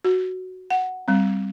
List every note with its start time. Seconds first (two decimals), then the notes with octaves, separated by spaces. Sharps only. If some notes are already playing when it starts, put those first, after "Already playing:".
0.04 F#4
0.70 F#5
1.08 G3 C4